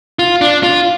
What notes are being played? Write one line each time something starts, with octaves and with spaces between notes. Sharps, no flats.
F4
D4
F4